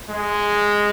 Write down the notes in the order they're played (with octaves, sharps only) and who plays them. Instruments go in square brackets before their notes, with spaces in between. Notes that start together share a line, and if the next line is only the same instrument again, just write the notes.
[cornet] G#3